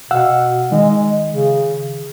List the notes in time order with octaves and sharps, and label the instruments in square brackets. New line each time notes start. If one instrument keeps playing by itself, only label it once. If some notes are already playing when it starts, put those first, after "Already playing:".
[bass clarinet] B2 [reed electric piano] F5 F#5 E6
[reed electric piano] D#3 [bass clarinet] G#3
[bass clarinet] C#3